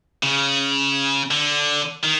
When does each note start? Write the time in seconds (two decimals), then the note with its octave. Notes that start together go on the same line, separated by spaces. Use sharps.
0.23 C#3
1.31 D3
2.04 D#3